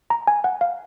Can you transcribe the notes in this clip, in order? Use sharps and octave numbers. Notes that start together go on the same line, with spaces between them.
A#5
G#5
F#5
F5